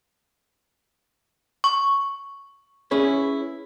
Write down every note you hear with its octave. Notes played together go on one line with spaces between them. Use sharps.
C#6
C#4 E4 G#4 B4 C#5